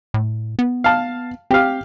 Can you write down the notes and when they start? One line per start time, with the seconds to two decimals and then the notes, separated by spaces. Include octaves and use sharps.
0.14 A2
0.59 B3
0.84 F5 A5
1.51 C4 G4 F5